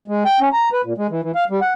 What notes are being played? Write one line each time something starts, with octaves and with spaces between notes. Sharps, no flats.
G#3
G5
C#4
A#5
B4
A#2
G#3
E3
E3
F5
G3
F#5